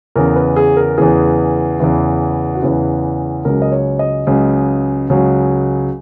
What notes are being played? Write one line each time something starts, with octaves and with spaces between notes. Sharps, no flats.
E2 C#3 E3 A#4
B4
G#4
A#4
E2 C#3 E3 G#4
E2 C#3 E3
F#4
E2 C#3 E3 G#4
C#2 C#3 F#3 A#4
D#5
C#5
D#5
C#2 C#3 F#3
C#2 C#3 F#3